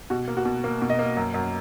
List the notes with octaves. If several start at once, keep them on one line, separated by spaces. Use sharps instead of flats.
B2 F#4
A#3
F#4
B2
A#3
B2
D#5
A#3
F#2
F#2